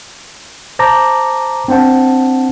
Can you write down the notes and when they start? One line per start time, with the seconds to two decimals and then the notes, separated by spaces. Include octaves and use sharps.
0.79 C5 A5 A#5 D6 A#6
1.68 C4 D4 C5 F#5 A5